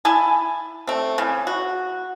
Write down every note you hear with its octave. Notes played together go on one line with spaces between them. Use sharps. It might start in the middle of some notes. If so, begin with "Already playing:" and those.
E4 G#5 A5
A3 C4
C#3 E3
F#4